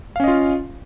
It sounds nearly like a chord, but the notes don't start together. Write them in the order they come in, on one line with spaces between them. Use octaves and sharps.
F5 C#4 D#5 F4